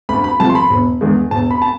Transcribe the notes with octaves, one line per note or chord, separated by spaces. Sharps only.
D2 B5
B5
C3 F3 A3 A5
C6
B5
E1
E2 D3 G#3
E1 A5
B5
A5